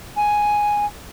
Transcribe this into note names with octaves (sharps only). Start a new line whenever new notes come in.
G#5